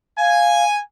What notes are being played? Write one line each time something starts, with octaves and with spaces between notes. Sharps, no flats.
F5 G#5